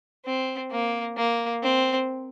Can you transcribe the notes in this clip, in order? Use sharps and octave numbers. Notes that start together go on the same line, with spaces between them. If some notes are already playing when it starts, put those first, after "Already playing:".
C4
A#3
A#3
C4